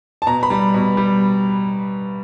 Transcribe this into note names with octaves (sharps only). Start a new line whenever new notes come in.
A5
B2 A#5
B5
G3
B2
G3